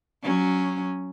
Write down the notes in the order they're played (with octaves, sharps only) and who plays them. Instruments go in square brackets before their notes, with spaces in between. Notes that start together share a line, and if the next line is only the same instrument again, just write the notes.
[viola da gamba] F#3 C#4